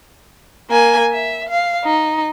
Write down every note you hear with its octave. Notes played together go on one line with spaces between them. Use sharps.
A#3 G#5
E5
F5
D#4